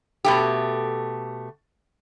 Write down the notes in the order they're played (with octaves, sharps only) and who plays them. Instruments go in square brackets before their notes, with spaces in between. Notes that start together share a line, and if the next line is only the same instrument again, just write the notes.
[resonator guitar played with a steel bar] B2 A3 G4